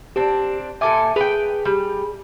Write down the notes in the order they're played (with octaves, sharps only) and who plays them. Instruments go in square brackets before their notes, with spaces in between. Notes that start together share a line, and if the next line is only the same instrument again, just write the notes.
[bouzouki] C4 D4 [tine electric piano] G4
[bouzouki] A#2 A4 G#5 [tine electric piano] E5 D6
[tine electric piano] G#4 [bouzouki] B4 G5
[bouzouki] G3